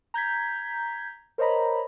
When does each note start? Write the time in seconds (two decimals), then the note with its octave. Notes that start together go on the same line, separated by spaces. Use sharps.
0.14 A#5 G6 G#6 B6
1.38 A#4 C5 C#5 D#5 A#5 B5